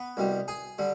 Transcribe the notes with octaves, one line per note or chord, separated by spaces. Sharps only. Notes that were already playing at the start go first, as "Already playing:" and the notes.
Already playing: B3 B4
C2 B2 G3
G#4 G#5
D3 G3